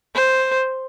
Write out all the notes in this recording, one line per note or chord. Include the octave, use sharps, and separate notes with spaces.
C5